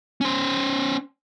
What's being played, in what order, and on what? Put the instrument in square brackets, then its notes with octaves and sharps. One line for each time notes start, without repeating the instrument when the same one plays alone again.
[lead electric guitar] C#4 C5